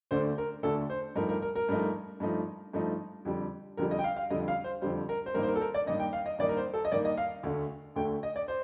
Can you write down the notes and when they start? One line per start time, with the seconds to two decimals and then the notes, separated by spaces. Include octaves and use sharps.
0.11 D2 D3 A3 D4 C5
0.38 A#4
0.63 D2 D3 A3 D4 A4
0.90 C5
1.15 G2 F3 A3 D#4 A#4
1.29 A#4
1.42 A#4
1.55 A#4
1.69 G2 F3 A3 D#4
2.20 G2 F3 A3 D#4
2.73 G2 F3 A3 D#4
3.25 F2 D3 G3
3.77 F2 D3 G3 A#4
3.91 D#5
3.99 G5
4.04 F5
4.17 F5
4.30 F2 D3 G3 D#5
4.48 F5
4.64 C5
4.82 F2 D3 G3 C5
5.09 A#4
5.26 C5
5.34 G2 D#3 A#3 D#4 A#4
5.43 C5
5.48 A#4
5.55 A4
5.61 A#4
5.74 D5
5.86 G2 D#3 A#3 D#4 D#5
6.00 G5
6.13 F5
6.26 D#5
6.39 G2 D#3 A#3 D#4 D5
6.49 A#4
6.57 C5
6.74 A4
6.85 D#5
6.92 G2 D#3 A#3 D#4 D5
7.05 D#5
7.18 F5
7.43 D2 D3 A3
7.96 D2 D3 A3 G5
8.23 D#5
8.36 D5
8.48 C5